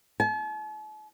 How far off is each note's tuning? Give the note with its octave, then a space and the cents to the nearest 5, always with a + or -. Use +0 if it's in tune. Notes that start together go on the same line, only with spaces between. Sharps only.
A5 -45